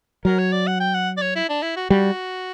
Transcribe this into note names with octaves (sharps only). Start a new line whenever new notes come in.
F#3 A#4
C#5
D5
F#5
G5
F#5
D5
C#5
E4
D4
E4
F#4
G3 F#4